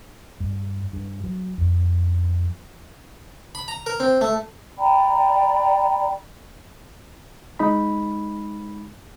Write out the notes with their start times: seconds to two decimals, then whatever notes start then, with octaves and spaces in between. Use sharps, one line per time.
0.40 G2
0.93 G2
1.24 F#3
1.58 F2
3.55 B5
3.68 A#5
3.86 A#4
4.00 C4
4.21 A3
4.77 D5 G5 A#5 B5
7.59 G#3 D#4 B5